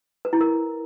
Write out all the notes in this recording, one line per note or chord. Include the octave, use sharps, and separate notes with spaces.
B4
E4
A#4